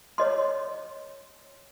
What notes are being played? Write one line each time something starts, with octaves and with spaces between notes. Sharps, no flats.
C#5 D#5 C6